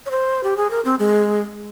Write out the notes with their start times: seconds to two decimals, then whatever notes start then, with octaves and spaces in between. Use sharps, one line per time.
0.06 C#5
0.11 C5
0.44 G4
0.57 G#4
0.70 A#4
0.85 C4
0.99 G#3